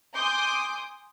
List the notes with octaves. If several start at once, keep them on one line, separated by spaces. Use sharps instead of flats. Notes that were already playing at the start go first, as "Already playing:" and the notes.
G#5 C6 D6 D#6 G6